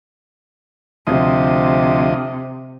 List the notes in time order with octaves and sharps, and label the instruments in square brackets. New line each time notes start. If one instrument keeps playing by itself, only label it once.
[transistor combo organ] D2 F3 D#5 [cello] C3